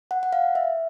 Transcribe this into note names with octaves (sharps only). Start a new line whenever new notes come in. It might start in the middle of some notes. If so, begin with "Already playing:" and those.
F#5
F#5
F5
E5